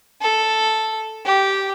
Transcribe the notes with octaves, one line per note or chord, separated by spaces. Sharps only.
A4
G4